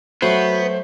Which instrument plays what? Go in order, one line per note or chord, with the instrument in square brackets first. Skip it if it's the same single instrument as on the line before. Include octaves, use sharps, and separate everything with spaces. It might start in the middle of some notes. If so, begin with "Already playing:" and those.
[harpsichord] F#3 A3 [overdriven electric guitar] B3 [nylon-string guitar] F#4 [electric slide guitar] C5